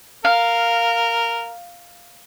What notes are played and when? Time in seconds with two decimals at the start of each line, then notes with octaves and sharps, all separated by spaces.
0.25 A#4 F5